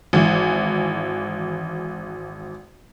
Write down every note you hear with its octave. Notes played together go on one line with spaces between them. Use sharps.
G#1 E3